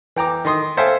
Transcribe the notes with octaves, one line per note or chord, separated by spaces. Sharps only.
E3 G5 A#5 D6
D#3 D#5 C6 D#6
A4 C5 E5 F5 G5 G#5